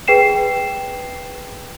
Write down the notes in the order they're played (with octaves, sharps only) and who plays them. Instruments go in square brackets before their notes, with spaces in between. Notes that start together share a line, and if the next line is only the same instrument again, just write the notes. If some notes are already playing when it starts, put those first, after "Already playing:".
[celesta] G#4 B4 G5 C7 E7